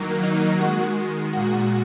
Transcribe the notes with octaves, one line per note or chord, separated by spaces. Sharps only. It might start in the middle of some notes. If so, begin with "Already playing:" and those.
Already playing: D#3 F#3 A#3
D#4
D#3 G#3 F#4
A#2 G#3 F#4